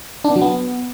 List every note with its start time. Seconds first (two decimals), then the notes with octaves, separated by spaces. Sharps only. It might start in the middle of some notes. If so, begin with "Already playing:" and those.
0.24 D4
0.30 B3
0.36 F#3
0.41 B3